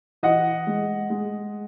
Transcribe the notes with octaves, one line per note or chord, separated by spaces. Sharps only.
E3 D#5 F#5
G#3
G#3